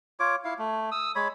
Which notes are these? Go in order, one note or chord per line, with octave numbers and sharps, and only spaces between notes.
F4 C#5 D6
E4 F5
A3
D#6 E6
G#3 C#5 B5